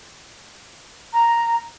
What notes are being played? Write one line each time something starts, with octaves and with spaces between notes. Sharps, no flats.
A#5